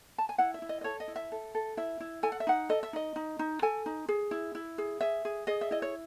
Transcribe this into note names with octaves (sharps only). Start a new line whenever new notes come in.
A5
G#5
E4 F#5
E5
E4
D#5
D#5
A4 C#5
D#5
E4
E5
A4
A4
E4 E5
E4
A4 G#5
F#5
E5
D#4 F#5
A4 D#5
E5
D#4 D#5
D#4
D#4
A4 G#5
D#4
G#4
E4
E4
G#4
G#4 E5
G#4
G#4 D#5
E5
E4 D#5
C#5